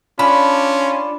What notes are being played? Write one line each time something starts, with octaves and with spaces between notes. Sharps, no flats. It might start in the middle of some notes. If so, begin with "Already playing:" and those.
C#4 D4 F4 B5